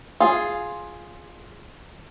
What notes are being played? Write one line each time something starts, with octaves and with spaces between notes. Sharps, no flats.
F4 G#4